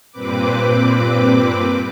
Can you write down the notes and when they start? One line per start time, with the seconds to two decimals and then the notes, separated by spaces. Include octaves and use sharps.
0.12 G2 A#2 C4 B4 D6